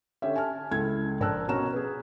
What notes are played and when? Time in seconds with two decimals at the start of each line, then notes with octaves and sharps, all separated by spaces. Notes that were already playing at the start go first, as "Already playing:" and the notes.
0.22 D3 C#4 G4 E5
0.36 G#5 A5 F6
0.71 C#2 E4 A4 G#6
1.20 A#1 A#4 A5 E6 F#6
1.48 B2 C#4 F#4 A#5 F6 E7
1.73 G#4 B4